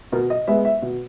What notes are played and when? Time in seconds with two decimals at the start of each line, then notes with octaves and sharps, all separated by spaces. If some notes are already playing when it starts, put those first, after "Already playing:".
0.12 B2 A#4
0.30 D#5
0.47 G#3 B3 E5
0.65 E5
0.82 B2